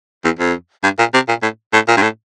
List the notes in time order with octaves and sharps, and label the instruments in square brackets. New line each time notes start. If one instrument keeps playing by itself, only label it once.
[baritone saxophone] E2
F2
G2
A#2
C3
A#2
A2
A2
A#2
G2
A2